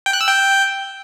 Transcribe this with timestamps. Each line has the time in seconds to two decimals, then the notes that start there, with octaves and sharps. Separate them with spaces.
0.06 G5
0.13 F#6
0.21 E6
0.28 G5